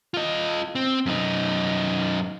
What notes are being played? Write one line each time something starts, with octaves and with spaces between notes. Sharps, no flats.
F4 D#5
C4
F#2 D#4